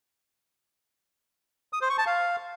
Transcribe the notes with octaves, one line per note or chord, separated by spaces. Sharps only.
D#6
C5
C#6
A5
F5